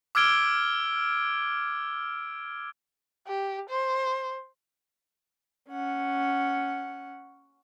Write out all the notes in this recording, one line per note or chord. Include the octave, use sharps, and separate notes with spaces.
D6 E6 F6 G#6 D7 G7
G4
C5
C#4 F#5